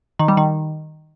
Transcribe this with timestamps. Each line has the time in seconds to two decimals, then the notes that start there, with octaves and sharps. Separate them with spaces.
0.19 D#3
0.28 G3
0.37 D#3